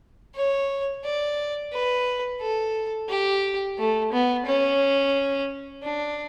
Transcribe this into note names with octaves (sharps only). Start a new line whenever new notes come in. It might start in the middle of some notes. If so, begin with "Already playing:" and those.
C#5
D5
B4
A4
G4
A3
B3
C#4
D4